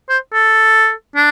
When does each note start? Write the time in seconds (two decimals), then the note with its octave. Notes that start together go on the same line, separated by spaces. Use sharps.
0.09 C5
0.33 A4
1.16 D4